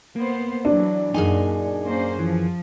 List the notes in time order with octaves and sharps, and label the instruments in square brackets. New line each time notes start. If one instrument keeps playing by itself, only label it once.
[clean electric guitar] A#3 [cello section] B3 C5
[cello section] E3 F#3 [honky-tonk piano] D4
[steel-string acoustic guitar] F#2 G#4 G#5 [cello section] A#2 [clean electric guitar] D#4
[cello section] A#3 C#4 C5
[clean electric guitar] E3 [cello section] F3